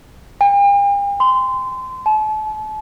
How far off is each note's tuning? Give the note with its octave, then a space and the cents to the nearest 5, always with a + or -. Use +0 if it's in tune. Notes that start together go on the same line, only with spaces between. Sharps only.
G5 +45
C6 -25
A5 -40